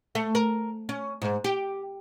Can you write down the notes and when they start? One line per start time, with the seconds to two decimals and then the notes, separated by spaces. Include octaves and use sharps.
0.15 A3
0.35 A#4
0.89 C#4
1.22 G#2
1.44 G4